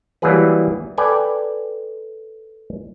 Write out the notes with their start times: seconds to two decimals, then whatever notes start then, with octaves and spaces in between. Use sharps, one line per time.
0.22 E3 F#3 G3 A#3 G#4 B4
0.98 A4 B4 D5 G5 G#5